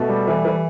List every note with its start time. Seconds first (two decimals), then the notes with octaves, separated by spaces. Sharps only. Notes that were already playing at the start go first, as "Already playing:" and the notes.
Already playing: B2 A3 A4
0.09 G3
0.27 E3
0.45 E3